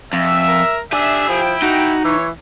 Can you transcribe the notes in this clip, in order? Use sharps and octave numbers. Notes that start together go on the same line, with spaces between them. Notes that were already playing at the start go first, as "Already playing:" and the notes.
F2 E5
A#4
D4 G4 E5 G#5
F3 E4 G5
D#4 F#4
E3 C#5